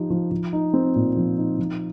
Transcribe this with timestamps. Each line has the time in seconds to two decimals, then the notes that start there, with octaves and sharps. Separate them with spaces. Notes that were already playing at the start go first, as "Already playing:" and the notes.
Already playing: F3 D#4 G4
0.10 F3
0.31 F3
0.53 D#4
0.74 C4
0.96 A#2
1.16 F3
1.38 D#4
1.59 F3